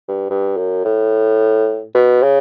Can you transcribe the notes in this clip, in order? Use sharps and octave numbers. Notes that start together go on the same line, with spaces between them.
G2
G2
F#2
A2
B2
C#3